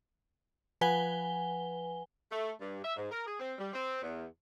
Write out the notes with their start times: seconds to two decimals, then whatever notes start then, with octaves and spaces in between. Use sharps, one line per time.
0.81 F3 B4 F#5 G#5 G7
2.31 A3
2.60 G2
2.83 E5
2.96 G#2
3.10 A#4
3.26 G#4
3.40 C4
3.58 G3
3.73 C4
4.02 E2